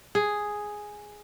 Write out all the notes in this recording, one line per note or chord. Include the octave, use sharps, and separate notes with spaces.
G#4